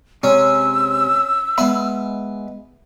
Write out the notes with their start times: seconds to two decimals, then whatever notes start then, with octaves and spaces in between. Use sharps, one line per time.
0.23 C3 G#3 C#4 E6
1.58 G#3 B3 E5 B5